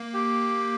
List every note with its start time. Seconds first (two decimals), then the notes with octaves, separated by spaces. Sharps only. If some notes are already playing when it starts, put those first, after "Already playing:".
Already playing: A#3
0.14 G4